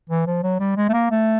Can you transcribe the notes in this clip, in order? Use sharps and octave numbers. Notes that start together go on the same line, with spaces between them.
E3
F3
F#3
G3
G#3
A3
A#3
A3